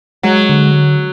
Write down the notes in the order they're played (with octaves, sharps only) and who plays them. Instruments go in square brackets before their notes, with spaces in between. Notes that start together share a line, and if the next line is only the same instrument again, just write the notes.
[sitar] F#3 [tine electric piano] G#3
[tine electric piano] D3